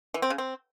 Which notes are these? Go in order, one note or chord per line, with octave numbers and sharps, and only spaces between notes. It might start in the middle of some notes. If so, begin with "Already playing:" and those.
E3
C4
C#3
C4